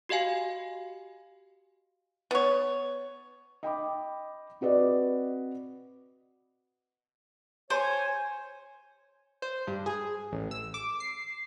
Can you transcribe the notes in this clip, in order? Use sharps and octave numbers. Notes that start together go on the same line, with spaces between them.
F#4 G4 D#5 F5 G#5
B3 C#5
D#5 G5 B5 D6
C4 F#4 B4 D5 D#5
C5 C#5 G#5
C5
G2
G#4
A1
E6
D6
C7